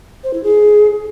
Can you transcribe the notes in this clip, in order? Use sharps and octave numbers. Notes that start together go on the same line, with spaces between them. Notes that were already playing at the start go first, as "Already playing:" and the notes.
C5
E4
G#4